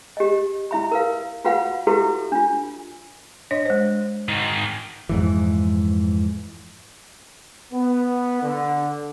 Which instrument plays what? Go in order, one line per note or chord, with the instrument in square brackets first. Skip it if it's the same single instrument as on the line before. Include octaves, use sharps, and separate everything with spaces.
[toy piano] G4 D#5
E4 E5 B5
A#4 B4 F5
F4 F#4 B4 F5 F#5 B5
E4 F#4 G4 A4 B4 E5
D4 F4
[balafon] D4 C#5 D#5
G#3 C5
[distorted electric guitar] G#2 D#3
[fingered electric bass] F2 G#2 E3
[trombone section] B3
D3